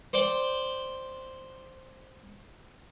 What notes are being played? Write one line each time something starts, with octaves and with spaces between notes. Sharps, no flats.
C5 D5 G5